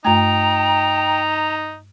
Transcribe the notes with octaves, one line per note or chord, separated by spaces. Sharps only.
G2 A3 D#4 G5 A#5